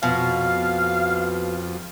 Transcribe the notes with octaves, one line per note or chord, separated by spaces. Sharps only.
F2 B2 F5